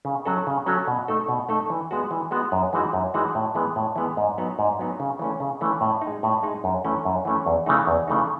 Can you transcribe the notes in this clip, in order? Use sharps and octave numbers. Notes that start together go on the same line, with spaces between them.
C#3
F#3 C#4 F#4 A4
C#3
F#3 C#4 F#4 A4
B2
A3 D#4 A4
B2
A3 D#4 A4
E3
G#3 B3 F#4
E3
G#3 B3 F#4
F#2
E3 G#3 D#4 F#4
F#2
E3 G#3 D#4 F#4
A2
E3 G#3 B3
A2
E3 G#3 B3
G#2
F#3 B3 D#4
G#2
F#3 B3 D#4
C#3
E3 A3 C#4
C#3
E3 A3 C#4
A2
D#4
G#3
A2
G#3 D#4
F#2
E3 A3 C#4
F#2
E3 A3 C#4
E2
C#3 E3 A3 D#4
E2
C#3 E3 A3 D#4